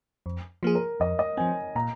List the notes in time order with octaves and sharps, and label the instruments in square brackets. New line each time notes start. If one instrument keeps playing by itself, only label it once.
[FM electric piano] F2
F3 A#3 G#4
[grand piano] A#4
[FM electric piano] F2 [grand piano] D#5
[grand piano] D#5
[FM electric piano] F3 C4 [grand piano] G#5
[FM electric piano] A#2 [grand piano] A#5